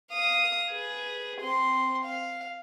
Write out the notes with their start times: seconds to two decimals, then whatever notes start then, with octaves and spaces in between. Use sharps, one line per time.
0.11 F5 D#6
0.71 G#4 B4
1.41 C4 C6
2.06 F5